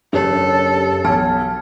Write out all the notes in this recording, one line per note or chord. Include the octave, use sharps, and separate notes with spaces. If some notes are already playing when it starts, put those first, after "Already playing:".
F#1 D4 G4 A4 C#5
B1 A5 F6 G#6